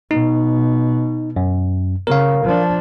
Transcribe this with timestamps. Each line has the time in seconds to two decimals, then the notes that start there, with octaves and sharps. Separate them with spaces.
0.11 B2 D#4
1.36 F#2
2.07 C#3 A#4 F5
2.45 F3 D4